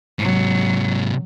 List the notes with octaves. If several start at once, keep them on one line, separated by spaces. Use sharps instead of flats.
G#2 C3 F#3